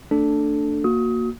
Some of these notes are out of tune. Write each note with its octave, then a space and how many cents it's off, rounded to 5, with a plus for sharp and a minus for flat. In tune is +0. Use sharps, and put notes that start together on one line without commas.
A3 +40 D4 +0 A4 -5
A#3 +0 F#4 -15 D#6 +30